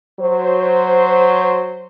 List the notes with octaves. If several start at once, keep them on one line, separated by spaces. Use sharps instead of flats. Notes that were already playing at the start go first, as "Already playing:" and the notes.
F#3 C5